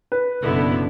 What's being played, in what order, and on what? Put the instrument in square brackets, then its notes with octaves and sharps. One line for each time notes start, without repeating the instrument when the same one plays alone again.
[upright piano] B4
[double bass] F#1 B2 [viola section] D3 B3 E4